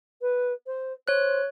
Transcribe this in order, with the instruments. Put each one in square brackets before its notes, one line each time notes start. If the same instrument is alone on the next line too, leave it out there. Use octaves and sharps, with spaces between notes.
[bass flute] B4
C5
[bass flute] C5 [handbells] C#5 F#6